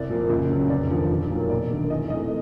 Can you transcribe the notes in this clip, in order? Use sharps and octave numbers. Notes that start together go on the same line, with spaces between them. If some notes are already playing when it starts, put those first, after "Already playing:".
Already playing: C2 D5
A#2 F3 A#3
C#2
C#3 F#3
F1 D5
D#2 D3 F3
B1
A#2 F#3 A#3
E1 D5
D#2 D3
E2 D#5
C3 E3 A3 D#5